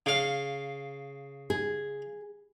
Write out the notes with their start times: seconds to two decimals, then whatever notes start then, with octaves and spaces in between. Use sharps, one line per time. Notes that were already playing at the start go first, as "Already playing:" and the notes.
0.06 C#3 F5
1.50 G#4